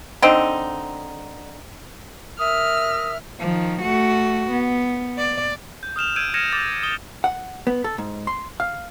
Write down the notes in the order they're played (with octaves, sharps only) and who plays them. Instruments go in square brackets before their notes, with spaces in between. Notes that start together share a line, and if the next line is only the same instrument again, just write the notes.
[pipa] D3 C4 D#4
[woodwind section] A#4 E5 [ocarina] D#6 [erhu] F6
[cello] D#3 F3
A3 F#4
B3
D5
[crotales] G6
D#6 F6 E7 F7
E6 G6 G#6 D7 D#7
F6 G#6 A#6 C#7 D#7 E7
D6 A6 A#6
D#6 G7
[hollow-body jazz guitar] F#5
B3
A4
G#2
C6
F5